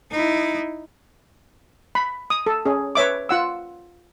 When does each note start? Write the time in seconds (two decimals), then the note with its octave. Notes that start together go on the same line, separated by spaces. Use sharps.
0.11 D#4 E4
1.95 B5
2.30 D#6
2.46 A4
2.66 C#4 G#4
2.95 B4 C#5 E5 D6
3.29 F4 F#5 E6